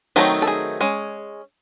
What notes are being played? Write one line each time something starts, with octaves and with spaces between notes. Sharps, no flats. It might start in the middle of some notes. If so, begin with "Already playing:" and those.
D#3 F#3 A3 C4 D#4
A4
G#4
G#3 C#4